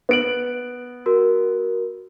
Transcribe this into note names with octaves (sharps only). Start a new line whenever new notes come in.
B3 D7 F#7
F#4 A#4